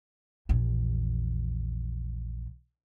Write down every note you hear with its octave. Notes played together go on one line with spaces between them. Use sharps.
A#1 E2